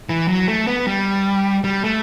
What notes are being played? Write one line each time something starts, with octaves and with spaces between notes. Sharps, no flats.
E3
F#3
A3
B3
G3
G3
A3